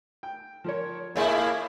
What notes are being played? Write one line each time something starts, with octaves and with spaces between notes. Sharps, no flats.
G5
F3 A#4 C#5
A2 G#3 A#3 E4 G#4 C#5 E5